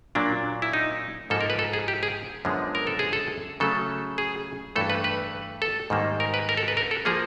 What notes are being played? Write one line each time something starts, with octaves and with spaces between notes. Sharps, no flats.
A#2 F#3 A#3 D4
E4
D#4
G#2 F3 A#3 A4
A#4
B4
A4
G#4
G4
G#4
F#2 D3 F3 G#3 B3
A#4
A4
G#4
A4
C#3 F#3 A3 A4
G#4
G2 E3 A3 A4
B4
B4
A4
G#2 D#3 G3 A#3
A#4
B4
A#4
A4
B4
A#4
A4
F3 A#3 G#4